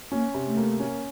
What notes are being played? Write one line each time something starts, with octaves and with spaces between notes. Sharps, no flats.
A#3 C#4
C3
A3
A#3
C#4